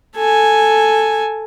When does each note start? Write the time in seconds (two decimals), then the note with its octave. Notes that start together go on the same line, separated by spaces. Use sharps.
0.16 A4 G#5